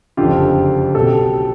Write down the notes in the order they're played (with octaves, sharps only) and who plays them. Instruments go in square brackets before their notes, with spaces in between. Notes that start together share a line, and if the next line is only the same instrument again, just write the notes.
[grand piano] F#1 F2 D3 F4 G4
B1 B2 G4 A4